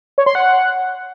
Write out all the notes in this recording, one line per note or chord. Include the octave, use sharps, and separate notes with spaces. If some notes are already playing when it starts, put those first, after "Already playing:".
C#5
C6
F#5